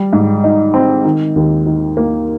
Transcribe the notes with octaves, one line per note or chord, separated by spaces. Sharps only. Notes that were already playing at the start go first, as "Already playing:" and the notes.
Already playing: G3
G#2
D#4
C4
D#3
D#2
D#3
A#3